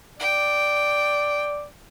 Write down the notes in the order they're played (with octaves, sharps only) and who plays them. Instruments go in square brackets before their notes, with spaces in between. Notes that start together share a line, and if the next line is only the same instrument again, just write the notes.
[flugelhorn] D5 [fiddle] G5